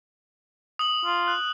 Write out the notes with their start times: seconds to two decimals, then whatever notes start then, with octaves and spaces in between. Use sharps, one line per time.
0.79 D#6 F#7
1.05 F4
1.28 F#6